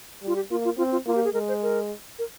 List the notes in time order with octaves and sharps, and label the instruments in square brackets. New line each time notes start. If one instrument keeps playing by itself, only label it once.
[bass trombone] G3 [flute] F4
[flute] G4
[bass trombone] A#3 [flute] F4
[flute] F4
[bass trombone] C4 [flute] F4
[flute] F4
[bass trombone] A#3 [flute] F4
[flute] G4
G#4
[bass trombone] G#3 [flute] A#4
[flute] C5
A#4
A#4